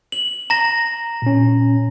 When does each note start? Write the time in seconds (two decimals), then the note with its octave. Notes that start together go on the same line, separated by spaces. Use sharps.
0.12 F#7
0.50 A#5 A#6
1.22 A#2 C#4